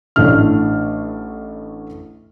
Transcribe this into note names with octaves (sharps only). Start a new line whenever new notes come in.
A1 A2 A3 D4 F6